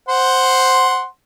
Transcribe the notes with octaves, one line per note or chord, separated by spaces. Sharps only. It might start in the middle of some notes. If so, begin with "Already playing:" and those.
C5 F#5 C6